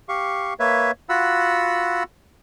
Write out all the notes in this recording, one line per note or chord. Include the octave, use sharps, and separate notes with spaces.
G4 F5 C#6
A#3 B4 C#5 E5
F4 F#4 F#5 B5 E6